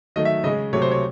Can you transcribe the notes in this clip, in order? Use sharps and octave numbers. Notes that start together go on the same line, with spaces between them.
D#3 F#3 A3 D#5
E5
C#3 G#3 D#5
C3 F#3 A3 C#5
C5
C#5